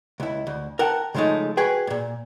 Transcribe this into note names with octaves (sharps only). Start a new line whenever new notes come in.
C#2 E4
D2
A#4 F#5 G5 A5
C#3 F3 G#3 A3 D#4
F#4 G#4 B4 G5
G2 A#2